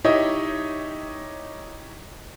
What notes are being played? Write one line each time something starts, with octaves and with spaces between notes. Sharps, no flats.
D#4 E4 G4 C#5 D#5